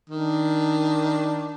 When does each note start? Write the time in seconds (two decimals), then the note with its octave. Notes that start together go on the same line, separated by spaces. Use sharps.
0.10 D#3 D4